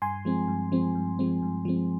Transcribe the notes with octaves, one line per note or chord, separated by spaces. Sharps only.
G2 G#5 C6
F3 G#3 C4
G2
F3 G#3 C4
G2
F3 G#3 C4
G2
F3 G#3 C4